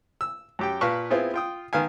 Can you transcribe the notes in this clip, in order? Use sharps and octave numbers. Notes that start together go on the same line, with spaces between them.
E6
F#2 G4 G5
A#2 B4 F5 A5 C#6
B3 C4 E4 F4 G#4
F4 G5 D#6
D#3 B3 F5 G#5